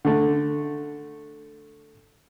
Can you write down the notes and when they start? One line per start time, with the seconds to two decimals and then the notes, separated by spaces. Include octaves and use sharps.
0.05 D3 A3